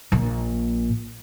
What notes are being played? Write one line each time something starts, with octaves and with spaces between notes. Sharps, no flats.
A#1 A#2